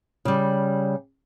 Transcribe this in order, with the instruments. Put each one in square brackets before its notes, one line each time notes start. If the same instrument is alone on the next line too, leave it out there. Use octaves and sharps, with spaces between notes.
[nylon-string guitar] C#3 G3